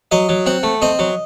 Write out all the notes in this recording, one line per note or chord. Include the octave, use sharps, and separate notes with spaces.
F#3 D#5
F#3
C4 F#5
A3
C4 D#5
F#3